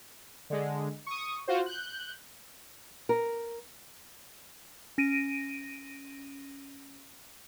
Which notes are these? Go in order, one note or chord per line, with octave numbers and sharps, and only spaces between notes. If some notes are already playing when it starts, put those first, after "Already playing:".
D3 G#3
C#6 D#6
F4 F#4 C5
F#6 G6
A#4
C#4 A#6 D7 D#7